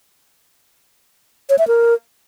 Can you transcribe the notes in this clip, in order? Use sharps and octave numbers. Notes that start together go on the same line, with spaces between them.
C#5
E5
A#4